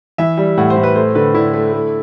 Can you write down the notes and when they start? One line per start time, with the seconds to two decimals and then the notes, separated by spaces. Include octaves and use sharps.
0.18 E3 E5
0.37 G3
0.57 A2 F#5
0.70 C5
0.77 A2
0.83 B4
0.95 A3 C5
1.15 D3 B4
1.34 D3 E4
1.53 A3
1.73 A3